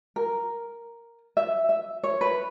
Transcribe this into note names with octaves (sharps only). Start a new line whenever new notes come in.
A#4
E5
E5
C#5
B4